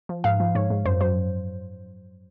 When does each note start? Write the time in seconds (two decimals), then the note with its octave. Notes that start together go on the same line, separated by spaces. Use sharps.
0.09 F3
0.24 G#2 F5
0.40 F3
0.55 G#2 C#5
0.70 G#2
0.86 F#2 C5
1.01 F#3 C5